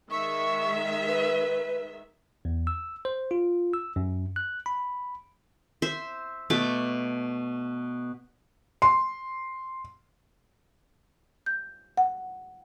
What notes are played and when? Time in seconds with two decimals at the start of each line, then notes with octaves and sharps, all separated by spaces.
0.11 D#3 G#3 E5 C#6
1.08 B4
2.45 E2
2.67 E6
3.05 C5
3.31 F4
3.74 E6
3.96 F#2
4.36 F#6
4.66 B5
5.82 C5 E5
6.50 B2 A3 D6
8.82 C6
11.46 G6
11.97 F#5